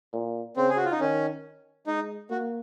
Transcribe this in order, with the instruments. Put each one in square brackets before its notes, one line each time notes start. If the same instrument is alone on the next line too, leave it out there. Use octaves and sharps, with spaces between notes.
[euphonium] A#2
[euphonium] C#3 [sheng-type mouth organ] C4
[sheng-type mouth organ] G#4
F#4
F4
D#4
[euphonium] D#3 [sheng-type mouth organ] C#4
[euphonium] G#3 [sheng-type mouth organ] D#4
[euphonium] A#3 [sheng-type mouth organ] F#4